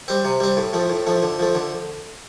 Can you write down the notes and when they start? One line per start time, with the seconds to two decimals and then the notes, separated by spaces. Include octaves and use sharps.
0.08 G3 C4
0.25 C3
0.40 G3 C4
0.57 A2
0.73 F3 A3
0.90 A2
1.07 F3 A3
1.23 D3
1.39 F3 A3
1.55 D3